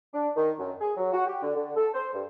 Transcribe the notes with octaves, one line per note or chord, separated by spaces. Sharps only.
D4
D#3
F#2
G#4
F#3
F#4
G4
D3
D3
A4
C5
G2